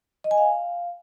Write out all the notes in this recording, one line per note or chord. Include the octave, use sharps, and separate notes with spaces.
D#5
G#5
F5